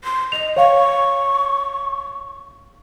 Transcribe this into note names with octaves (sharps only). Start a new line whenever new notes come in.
C6
D#5 F7
C#5 F5 C#6